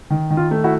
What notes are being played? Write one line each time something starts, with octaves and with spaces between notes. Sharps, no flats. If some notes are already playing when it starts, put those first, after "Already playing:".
D#3
D#3
F4
A3
E4 F#4